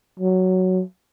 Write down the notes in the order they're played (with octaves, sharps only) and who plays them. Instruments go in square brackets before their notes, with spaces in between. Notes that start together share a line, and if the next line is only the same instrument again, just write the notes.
[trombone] F#3